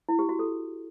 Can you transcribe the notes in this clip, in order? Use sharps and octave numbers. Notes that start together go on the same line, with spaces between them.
E4
G4
F#4
A4